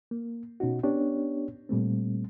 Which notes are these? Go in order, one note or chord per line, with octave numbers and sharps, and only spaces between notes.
A#3
B2 C#4 D#4 F#4
B3 C#4 D4 G4 C#5
A#2 G3 A3 C4